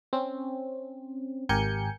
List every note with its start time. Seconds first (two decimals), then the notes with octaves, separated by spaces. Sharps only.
0.13 C4 C#4
1.49 G#1 G4 A#4 G#5 G6 C#7